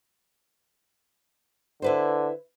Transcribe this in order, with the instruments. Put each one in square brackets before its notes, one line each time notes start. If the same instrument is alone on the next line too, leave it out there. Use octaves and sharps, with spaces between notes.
[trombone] D3 [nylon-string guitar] E4 B4 C5